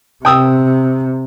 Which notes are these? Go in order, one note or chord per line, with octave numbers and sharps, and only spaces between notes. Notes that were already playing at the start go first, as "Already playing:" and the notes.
C3 G5 D#6 E6